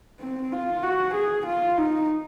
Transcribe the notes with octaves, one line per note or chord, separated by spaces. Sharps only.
C4
F4
F#4
G#4
F4
D#4